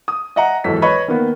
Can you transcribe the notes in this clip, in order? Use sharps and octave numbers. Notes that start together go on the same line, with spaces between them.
D#6
D#5 E5 F#5 A#5
G#1 E2 E3 F#3 A4 B6
B4 C#5 D#5 B5 C#6
D#3 A#3 B3